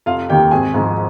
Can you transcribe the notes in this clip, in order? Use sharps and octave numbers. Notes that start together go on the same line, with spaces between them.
F1 F4 F5
D#2 D#3 G4 G5
G#1 G#4 G#5
G#2 F3 G#3